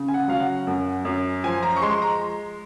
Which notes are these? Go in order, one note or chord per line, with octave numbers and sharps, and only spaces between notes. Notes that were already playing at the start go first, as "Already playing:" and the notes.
Already playing: C#3
G#5
F#5
F#3 F5
F#5
F#2
F#2
F3 G#5
A#5
C#6
G#3 C6
A#5